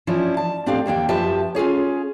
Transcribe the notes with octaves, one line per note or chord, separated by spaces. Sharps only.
E3 F3 C#4 D4 E4
A5
A2 C4 D4 G4 F5
D#2 A#3 D4 G5
F#2 F3 G4 B4 E5 A5
C#4 F4 G#4 C#5